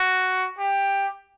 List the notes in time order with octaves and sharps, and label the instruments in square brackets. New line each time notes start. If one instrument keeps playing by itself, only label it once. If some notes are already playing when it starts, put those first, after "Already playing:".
Already playing: [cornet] F#4
G4